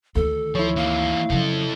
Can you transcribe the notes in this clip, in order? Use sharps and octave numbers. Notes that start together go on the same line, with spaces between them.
D2 D#3 A4
F3 E4 C#5
E3 A#3 F5
C#3 F3 F#3 A4